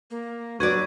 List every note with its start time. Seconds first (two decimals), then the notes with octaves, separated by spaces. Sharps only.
0.11 A#3
0.60 F#3 B4 C#5 D5 C#6 G#6